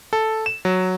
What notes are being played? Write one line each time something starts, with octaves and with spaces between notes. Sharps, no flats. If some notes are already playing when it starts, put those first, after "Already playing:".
A4
E7
F#3